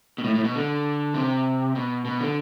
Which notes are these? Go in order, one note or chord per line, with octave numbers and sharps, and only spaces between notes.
B2
A2
A2
B2
D3
C3
B2
B2
D3